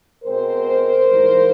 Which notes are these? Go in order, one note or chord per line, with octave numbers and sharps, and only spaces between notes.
B2 G#3 C4 A#4 C5
G#2 E3 G3 A#3